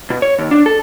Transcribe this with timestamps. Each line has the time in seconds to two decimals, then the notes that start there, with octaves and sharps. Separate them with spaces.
0.10 B2
0.22 C#5
0.39 D#2
0.51 D4
0.66 A4